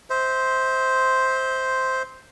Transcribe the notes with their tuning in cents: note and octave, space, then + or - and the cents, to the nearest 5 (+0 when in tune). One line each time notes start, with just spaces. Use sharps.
C5 +0 E5 -35 C6 +0